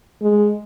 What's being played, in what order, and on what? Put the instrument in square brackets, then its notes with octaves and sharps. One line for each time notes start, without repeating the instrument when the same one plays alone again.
[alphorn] G#3